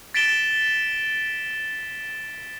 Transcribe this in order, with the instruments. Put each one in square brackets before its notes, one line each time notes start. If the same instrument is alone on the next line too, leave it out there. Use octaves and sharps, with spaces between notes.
[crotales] A6 B6 D7 E7 G7